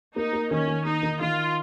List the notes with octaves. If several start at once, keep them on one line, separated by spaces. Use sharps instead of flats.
A#3 D#4
A#3
D#3 C#4
D#3
A#3 D#4
D#3
D#3 F4